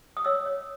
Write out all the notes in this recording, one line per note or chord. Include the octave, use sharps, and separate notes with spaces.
D#6
C#5 E6
C#5